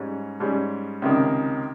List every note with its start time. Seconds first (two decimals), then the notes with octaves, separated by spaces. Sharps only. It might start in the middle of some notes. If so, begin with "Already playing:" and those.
Already playing: G#2 G3 C#4
0.40 G#2 G3 C#4
1.02 C#2 C3 D#3